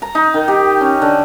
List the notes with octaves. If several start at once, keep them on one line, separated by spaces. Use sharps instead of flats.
A#5
D#4
D#3
G4
C#4
D3